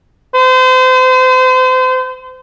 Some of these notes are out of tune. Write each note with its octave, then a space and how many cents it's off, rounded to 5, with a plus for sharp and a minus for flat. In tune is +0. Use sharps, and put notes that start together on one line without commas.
C5 -35